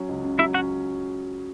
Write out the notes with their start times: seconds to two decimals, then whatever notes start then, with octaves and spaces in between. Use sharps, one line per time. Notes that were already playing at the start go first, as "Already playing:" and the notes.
Already playing: F#3 C#4
0.09 C#2
0.24 C#3
0.39 F#3 E4 E5
0.54 C#4 F#4 F#5